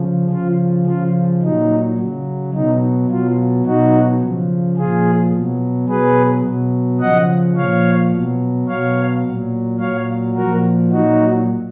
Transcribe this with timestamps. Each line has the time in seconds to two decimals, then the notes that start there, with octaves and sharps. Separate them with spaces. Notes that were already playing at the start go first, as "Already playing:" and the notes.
Already playing: C#3 F3
0.31 C#3 F3 F4
0.86 C#3 F3 F4
1.42 A#2 F#3 D#4
1.98 C#3 F#3
2.54 B2 F#3 D#4
3.10 B2 F#3 F4
3.66 B2 F#3 D#4 F#4
4.21 C#3 F3
4.77 A#2 F3 F4 G#4
5.34 B2 F#3
5.89 B2 F#3 G#4 B4
6.45 B2 F#3
7.01 C#3 F3 D#5 F#5
7.56 A#2 F3 C#5 F5
8.13 B2 F#3
8.68 B2 F#3 C#5 F5
9.24 A#2 F#3
9.79 A#2 F#3 C#5 F5
10.35 A#2 F3 F#4 A#4
10.91 A#2 F#3 D#4 F#4